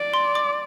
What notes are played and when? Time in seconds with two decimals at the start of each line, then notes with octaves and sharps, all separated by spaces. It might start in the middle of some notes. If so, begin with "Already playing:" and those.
Already playing: D5
0.14 C6
0.35 D6